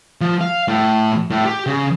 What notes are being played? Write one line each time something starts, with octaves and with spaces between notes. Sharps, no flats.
F3
F5
A2
A2
G4
C#3